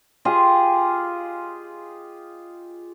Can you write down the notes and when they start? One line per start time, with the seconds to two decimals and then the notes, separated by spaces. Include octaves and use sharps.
0.25 F4 G4 G#4 D#5